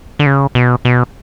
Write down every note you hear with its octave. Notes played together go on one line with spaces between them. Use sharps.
D3
C#3
B2
B2